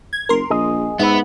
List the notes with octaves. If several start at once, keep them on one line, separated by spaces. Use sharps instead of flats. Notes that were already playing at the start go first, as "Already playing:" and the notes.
G#6
F#1 A#4 C6
A#1 G#4 D#5
G#2 B3 B4 E5